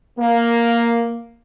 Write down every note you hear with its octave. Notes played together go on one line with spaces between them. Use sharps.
A#3